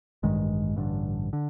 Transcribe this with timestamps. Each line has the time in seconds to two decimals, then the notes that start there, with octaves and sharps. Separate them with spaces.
0.23 A1 G2 D#3 G#3
0.76 A1 G2 D3
1.33 D3